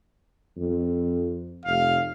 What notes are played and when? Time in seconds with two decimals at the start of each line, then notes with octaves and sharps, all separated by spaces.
0.57 F2
1.65 F1 F5